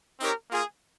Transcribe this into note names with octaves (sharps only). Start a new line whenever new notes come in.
C4 D#4 G4 A#4 C#5
A#3 F4 G#4